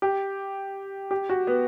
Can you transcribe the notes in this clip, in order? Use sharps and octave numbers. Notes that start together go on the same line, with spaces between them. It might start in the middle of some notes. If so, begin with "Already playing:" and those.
G4
G4
F#4
B3